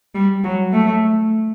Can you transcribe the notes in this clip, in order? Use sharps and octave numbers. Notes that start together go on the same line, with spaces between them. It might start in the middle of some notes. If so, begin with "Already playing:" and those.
G3
F#3
A3